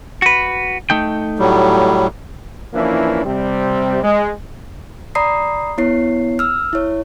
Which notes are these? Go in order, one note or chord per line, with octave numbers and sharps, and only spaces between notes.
F#4 B4
A3 D#4 G5
A2 F#3 G3
E3 F3 A#3 C#4 D4 E4
C3 G3 C4
G#3
D5 A#5 B5 D#6 C7
B3 E4 C#5 C7
E6 F6
E4 C#5